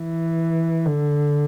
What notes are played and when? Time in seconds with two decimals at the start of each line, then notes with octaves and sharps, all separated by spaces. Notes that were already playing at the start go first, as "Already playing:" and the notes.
Already playing: E3
0.86 D3